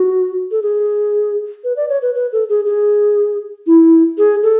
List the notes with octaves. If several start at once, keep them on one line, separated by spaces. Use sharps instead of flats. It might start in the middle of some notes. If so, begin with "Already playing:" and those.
Already playing: F#4
A4
G#4
B4
D5
C#5
B4
B4
A4
G#4
G#4
E4
G#4
A4